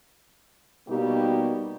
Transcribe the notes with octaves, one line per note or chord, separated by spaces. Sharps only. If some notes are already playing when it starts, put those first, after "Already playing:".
B2 G3 A#3 D#4 G4